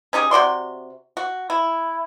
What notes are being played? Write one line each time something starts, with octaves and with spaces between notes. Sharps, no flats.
C#4 D#4 G4 G#4
C3 F#4 D5 C6
F#4
E4